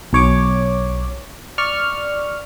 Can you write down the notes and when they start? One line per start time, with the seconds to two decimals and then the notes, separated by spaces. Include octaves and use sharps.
0.13 B1 C#5 D6
1.58 D5 C#6 F6